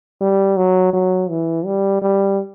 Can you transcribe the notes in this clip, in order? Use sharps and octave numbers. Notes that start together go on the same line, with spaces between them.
G3
F#3
F#3
E3
G3
G3